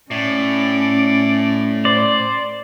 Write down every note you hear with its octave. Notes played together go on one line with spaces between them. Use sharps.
A2 C#4 D5
C5 D5